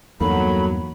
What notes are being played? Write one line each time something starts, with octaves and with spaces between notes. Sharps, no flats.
E2 G2 F#3 A#3 D#4 A4 B5